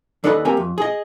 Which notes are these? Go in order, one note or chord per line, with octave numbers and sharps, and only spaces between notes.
D#2 D4 A4 B4 D#5 B5
A#3 C4 G4 A#4 E5 G#5
F2
G#4 D#5